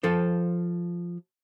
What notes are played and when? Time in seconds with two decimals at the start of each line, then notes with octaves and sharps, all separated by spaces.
0.03 F3 A4 C5